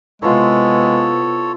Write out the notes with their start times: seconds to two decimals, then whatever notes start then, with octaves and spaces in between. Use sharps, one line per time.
0.22 C3 G#3 B3 E4 F4 A4 C#5